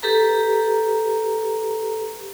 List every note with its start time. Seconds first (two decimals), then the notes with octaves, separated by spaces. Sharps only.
0.03 G4 A4 B4 A#5